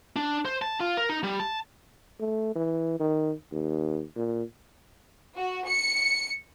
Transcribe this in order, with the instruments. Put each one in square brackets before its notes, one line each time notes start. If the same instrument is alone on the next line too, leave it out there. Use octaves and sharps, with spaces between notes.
[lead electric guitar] D4
C5
A5
F4
A#4
D#4
G3
A5
[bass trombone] A3
E3
D#3
D#2
A#2
[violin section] F#4
C#7